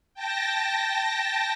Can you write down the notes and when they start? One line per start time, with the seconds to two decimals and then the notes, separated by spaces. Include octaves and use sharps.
0.14 G5 A5 A#6